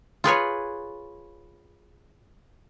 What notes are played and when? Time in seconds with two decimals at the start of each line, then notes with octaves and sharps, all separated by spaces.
0.24 F4 G#4 B4 C#5